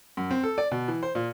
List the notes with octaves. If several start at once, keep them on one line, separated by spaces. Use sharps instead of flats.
F#2
C4
A4
D5
B2
E3
C5
A#2